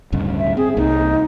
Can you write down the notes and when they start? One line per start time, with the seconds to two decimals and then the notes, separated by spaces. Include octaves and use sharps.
0.12 D1 G2 C#3
0.38 E5
0.57 C4 G#4
0.77 C2 A#3 D#4